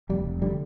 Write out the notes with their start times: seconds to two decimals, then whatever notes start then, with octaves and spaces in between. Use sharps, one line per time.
0.09 F1 G3
0.25 F1
0.42 D3 G3